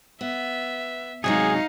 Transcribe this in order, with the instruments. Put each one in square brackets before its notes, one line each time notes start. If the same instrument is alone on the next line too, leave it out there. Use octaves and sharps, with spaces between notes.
[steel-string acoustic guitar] B3 [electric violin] E5
[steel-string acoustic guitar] C3 F#3 G#3 [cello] D#4 [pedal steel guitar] G#4 [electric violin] F5 C#7